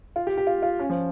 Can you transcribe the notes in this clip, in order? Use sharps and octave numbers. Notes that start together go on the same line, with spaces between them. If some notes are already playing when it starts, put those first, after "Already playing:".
F4
G4
G4
F4
F4
C#4
F3